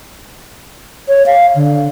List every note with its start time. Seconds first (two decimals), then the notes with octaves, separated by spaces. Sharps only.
1.08 C#5
1.26 F5
1.56 D3